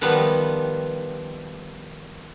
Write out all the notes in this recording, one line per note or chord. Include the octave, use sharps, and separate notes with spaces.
D#3 F3 G3 B3